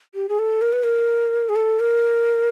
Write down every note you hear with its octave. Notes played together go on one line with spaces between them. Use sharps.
G4
G#4
A4
A#4
B4
A#4
G#4
A4
A#4